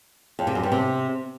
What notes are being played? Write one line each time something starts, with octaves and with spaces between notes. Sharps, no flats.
F2
C3
F#2
G2
C3